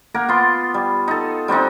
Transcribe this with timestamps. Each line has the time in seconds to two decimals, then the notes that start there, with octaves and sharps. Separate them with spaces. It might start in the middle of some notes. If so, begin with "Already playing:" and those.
0.14 A#3 A#4 F#5
0.28 B3 F4 C6
0.74 G3
1.08 D#4 A4
1.48 G3 C4 D4 D#4